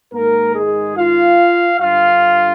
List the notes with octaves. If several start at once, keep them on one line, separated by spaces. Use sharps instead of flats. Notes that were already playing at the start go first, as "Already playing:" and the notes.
G#2 D#3 A#3 A#4
G#3 G#4
F4 F5
G2 D3 F4 F5